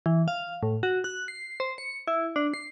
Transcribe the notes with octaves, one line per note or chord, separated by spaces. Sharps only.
E3
F5
A2
F#4
F#6
C7
C5
C#7
E4
D4
C7